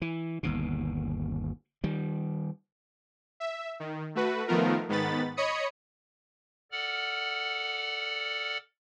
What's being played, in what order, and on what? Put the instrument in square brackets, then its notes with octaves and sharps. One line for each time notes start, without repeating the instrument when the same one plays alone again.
[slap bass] E3
G1 D#2 B2
D#3 G3
[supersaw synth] E5
D#3
A3 F#4 B4
D#3 F3 A3 B3 F4 A#4
G#2 D#3 B3 B5 A6
C#5 D#5 B5 D#6 C#7
[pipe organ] A4 D5 F#5 F6